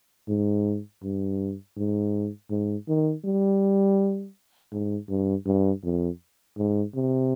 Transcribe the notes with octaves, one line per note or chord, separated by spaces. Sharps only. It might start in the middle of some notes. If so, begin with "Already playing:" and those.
G#2
G2
G#2
G#2
D#3
G3
G#2
G2
G2
F2
G#2
C3